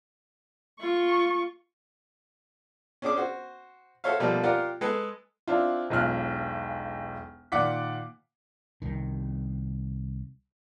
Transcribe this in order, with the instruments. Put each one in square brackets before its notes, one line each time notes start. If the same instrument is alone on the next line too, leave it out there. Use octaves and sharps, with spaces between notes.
[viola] F4 C#6
[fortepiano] C#4 D4 G#4 D6
F#4 C5
F#4 A4 C5 C#5 E5 F5
B2 F3 G3 A3 A#3
F4 G4 A#4 D5 F5 F#5
G#3 G#4 A4 B4
[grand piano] C4 D4 E4 F4
E1 B1 F4 F6 F#6
A#2 D#3 D5 F#5 D6 B6
[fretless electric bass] C2 D#3